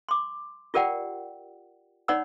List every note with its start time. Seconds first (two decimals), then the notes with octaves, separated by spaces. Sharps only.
0.09 C6 D6
0.74 F4 G4 A#4 D5 F#5 G5
2.08 D#4 C#5 D5 F#5 B5 E6